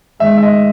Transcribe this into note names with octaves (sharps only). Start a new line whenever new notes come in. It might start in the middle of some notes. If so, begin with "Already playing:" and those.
G#2 D#3 G#3 E5
E5
D#5